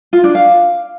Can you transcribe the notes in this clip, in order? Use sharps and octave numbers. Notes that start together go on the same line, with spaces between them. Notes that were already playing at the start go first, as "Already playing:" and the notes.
F4
D4
F5